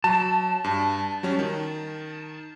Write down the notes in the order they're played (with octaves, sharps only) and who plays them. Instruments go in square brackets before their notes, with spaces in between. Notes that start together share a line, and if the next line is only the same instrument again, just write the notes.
[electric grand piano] F#3 [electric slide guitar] A5
[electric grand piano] G2
F#3 G3 C#4
D#3